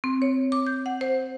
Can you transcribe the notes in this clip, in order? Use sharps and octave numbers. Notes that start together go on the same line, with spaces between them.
C4
C#5
D6
G6
F#5
C5